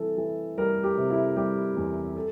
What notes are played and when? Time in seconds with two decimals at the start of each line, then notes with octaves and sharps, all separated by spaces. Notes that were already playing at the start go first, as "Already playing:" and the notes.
Already playing: C3 E3 G3 A4
0.18 E3
0.58 G3 A#4
0.83 G4
0.98 C3
1.10 E4
1.36 G3 G4
1.77 E2
2.16 A4